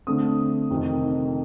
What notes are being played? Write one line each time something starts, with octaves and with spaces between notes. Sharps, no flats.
D3 A3 C4 D#6
F2 C3 D#3